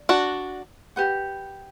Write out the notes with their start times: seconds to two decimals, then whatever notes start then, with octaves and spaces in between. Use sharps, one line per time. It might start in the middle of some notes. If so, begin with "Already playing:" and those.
Already playing: D5
0.09 D4 F#4
0.96 G4 B4 F#5